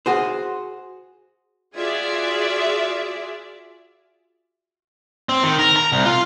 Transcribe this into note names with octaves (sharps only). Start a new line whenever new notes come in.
F#4 G#4 C5
F4 F#4 G#4 D5 E5
C4
D#3
A#4
A#5
C2
F4